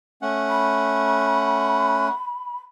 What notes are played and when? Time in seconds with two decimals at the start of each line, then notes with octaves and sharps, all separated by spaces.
0.22 A3 C#4 F#5
0.49 B5